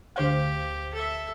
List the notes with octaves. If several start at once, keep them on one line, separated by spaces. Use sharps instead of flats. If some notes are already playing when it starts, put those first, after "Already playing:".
D2 G4 C5 F5
A4 E5